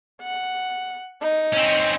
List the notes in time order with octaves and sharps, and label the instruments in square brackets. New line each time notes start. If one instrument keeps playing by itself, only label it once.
[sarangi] F#5
D#4
[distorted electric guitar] C4 C#4